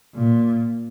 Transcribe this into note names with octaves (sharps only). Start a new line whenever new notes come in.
A#2